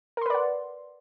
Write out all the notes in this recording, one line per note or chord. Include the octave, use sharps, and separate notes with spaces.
A#4 B4 D5 F#5 C6